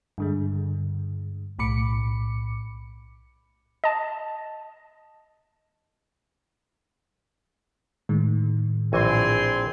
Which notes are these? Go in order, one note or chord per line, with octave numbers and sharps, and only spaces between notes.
G2 D3 G#3
B1 A2 B5 D6 C#7
D#5 A5
A2 D#3 G#3
A#1 E3 C4 G#5 C6